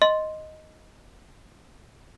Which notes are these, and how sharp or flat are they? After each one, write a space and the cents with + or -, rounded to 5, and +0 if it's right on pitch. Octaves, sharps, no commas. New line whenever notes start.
D#5 +0 C6 +0